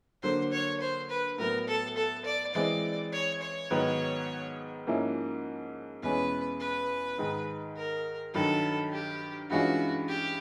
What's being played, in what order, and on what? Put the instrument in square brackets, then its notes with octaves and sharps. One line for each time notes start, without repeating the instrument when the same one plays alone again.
[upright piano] D3 F#3 A#3 [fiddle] C5
[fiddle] C#5
C5
B4
[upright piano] A2 F#3 B3 [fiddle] A#4
[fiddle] A4
A4
D5
[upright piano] E3 G#3 C4 [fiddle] D5
[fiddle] C#5
C#5
[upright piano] G#2 D#3 F#3 B3
G#2 F3 A#3 C#4 E4
[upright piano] E2 B2 G#3 C#4 [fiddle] B4
[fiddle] B4
[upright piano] G#2 D#3 G#3
[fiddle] A#4
[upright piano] G2 D#3 F#3 [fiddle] A4
[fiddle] G4
[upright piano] G2 E3 G#3 C#4 F4 [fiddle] F#4
[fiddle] G4